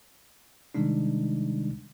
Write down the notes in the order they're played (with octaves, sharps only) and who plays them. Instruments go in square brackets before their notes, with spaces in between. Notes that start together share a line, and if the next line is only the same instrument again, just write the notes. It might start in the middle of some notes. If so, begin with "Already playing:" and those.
[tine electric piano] C3 D#3 G3 G#3 D4 D#4